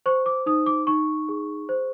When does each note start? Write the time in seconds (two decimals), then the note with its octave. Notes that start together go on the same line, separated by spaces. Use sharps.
0.06 C5 C#6
0.26 D6
0.46 D#4 D#6
0.66 D6
0.87 D#4 C#6
1.29 G#4
1.69 C5